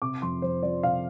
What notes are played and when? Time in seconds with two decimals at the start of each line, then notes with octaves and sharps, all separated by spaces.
0.02 C3 D6
0.22 F2 C6
0.42 F2 C5
0.63 F3 D5
0.83 C3 F5